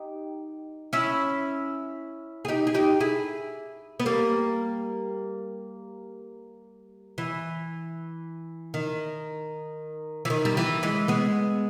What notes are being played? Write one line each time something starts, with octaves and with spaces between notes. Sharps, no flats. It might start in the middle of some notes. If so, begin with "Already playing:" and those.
Already playing: D#4 G4
C#4 E4
G#4
D#4 G4
G#4
D#4 G4
E4 G#4
B3
G3 A#3
E3
D#3
E3
D#3
G3
E3
E3 G#3
G#3 B3